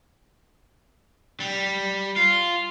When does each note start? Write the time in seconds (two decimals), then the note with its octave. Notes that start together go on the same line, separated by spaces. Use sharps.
1.40 G3
2.16 F4